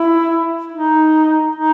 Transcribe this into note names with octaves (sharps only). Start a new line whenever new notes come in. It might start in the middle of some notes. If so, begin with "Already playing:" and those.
Already playing: E4
D#4
D#4